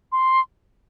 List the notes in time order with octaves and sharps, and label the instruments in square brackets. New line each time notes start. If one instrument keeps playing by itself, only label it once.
[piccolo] C6